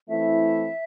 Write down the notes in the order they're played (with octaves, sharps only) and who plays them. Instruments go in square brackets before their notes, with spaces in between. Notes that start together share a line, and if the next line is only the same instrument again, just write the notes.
[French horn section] E3 A3 C4 E4 [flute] E5